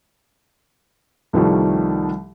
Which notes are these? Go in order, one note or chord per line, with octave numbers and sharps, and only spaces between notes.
C2 D#3 F3 G3 A3